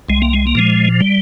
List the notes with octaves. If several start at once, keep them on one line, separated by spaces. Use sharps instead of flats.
C2 G#3
A#3
G#3
A#3
A#2 F3 G#3
G3